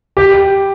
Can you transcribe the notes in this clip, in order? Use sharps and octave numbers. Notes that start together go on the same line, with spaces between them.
G4